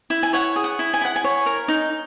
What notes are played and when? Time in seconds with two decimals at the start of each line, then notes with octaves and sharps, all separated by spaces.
0.10 E4
0.23 G#5
0.33 C#5 F#5
0.56 G#4
0.64 F#5
0.79 E4
0.94 G#5
1.01 E4 F#5
1.16 G#5
1.24 C#5
1.46 A#4
1.68 D#4